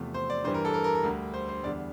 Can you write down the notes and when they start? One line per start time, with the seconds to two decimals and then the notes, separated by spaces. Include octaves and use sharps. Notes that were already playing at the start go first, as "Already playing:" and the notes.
Already playing: E2 C3 F3 A3
0.14 C5
0.30 D5
0.44 G2 E3 G3 C5
0.54 A#4
0.65 A4
0.74 A#4
0.84 A#4
0.95 A#4
1.03 D2 D3 G3
1.34 C5
1.48 C5
1.63 E2 D3 G3 D5